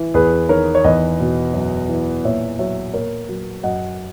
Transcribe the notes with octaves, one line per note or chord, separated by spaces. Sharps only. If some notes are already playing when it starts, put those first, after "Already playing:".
Already playing: E3
E2 G#4 B4
D#3 A#4 C#5
C#5
E2 B4 D#5
B2
F#2
E3
A#2 C#5 E5
F#3 C#5 E5
A#2 A#4 C#5
F#3
F#2 D#5 F#5